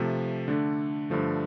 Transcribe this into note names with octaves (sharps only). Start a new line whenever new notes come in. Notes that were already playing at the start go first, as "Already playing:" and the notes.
Already playing: C3 F3 A3
D3 A3 D4
G2 D3 F3 A3